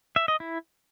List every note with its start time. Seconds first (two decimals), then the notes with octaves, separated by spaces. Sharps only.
0.16 E5
0.28 D#5
0.40 E4